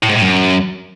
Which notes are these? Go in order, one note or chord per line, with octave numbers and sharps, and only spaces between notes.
A2
G#2
A2
F#2